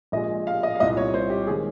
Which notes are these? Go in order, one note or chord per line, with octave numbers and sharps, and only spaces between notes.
A#1 A#2 G#3 D#5
F5
D#5
F5
C2 A#2 G3 D#5
C#5
C5
G4
D#3 G#3 G#4